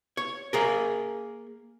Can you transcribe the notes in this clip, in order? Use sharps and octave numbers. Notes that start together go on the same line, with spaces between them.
C#5
A#3 G#4 A#4